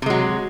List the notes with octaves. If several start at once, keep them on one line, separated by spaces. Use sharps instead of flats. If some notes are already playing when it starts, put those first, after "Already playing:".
C3 F#3 G#3